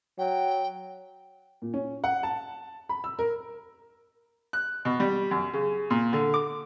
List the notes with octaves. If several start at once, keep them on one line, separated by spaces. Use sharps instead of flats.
F#3 G5
A#2
C#4
F#5
A5
B5
E6
A#4
F#6
B2
G3
F#2
C#3
A#2
D3
D6